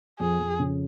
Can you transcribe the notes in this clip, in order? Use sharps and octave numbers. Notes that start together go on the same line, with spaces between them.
F2 G#4
F2
C#3